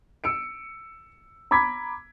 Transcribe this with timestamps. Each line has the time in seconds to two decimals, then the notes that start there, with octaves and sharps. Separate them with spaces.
0.24 E6 C#7 D7
1.51 A#5 B5 D6 G#6 B6